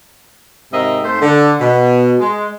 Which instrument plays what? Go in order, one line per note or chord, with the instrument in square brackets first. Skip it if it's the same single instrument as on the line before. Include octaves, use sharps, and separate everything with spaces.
[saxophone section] G#2 C3 C4 A#4 D#5 E5
G#2 A3 C4 C5
D3
B2
G#3